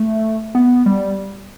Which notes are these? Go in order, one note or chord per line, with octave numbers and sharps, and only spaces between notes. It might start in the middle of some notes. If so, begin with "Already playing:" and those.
Already playing: A3
B3
G3